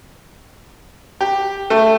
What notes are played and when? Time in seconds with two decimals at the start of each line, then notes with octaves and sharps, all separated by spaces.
1.20 G4
1.70 A3